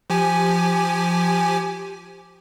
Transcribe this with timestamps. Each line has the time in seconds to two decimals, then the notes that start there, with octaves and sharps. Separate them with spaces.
0.10 F3 G4 G#5